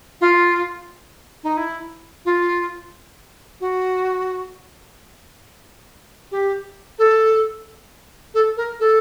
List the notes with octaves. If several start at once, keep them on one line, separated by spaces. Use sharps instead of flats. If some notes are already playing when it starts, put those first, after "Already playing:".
F4
D#4
E4
F4
F#4
G4
A4
A4
A#4
A4